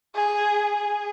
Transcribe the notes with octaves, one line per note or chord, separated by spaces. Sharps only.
G#4
G#4